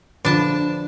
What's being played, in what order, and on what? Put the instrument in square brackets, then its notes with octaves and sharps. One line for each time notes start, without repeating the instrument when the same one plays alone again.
[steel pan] D3 F3 B4 [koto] D4 A5